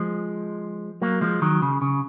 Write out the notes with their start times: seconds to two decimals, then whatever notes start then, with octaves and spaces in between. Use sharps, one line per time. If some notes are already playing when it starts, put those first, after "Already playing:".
Already playing: F3 G#3
1.02 F#3 A#3
1.21 F3 G#3
1.42 D#3 F#3
1.62 C#3
1.82 C#3